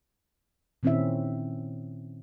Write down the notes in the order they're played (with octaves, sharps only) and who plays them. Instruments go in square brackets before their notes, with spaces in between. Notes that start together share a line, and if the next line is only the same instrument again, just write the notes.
[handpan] A#2 D#3 C4 C#4 E4 E5